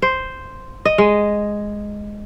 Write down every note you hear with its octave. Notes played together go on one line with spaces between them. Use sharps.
C5
D#5
G#3